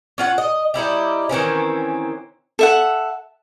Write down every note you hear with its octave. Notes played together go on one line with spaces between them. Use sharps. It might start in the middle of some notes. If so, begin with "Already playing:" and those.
C#4 F4 F#5
D#5
G3 D#4 E4 G4
D#3 E3 C4 C#4
A4 E5 F#5